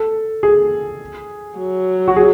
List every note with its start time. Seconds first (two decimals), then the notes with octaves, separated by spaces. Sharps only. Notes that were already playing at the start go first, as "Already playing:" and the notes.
Already playing: A4
0.43 G#4
1.58 F#3
2.08 F#4
2.16 G#4